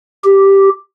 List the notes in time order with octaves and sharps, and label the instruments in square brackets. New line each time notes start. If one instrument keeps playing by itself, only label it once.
[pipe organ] G4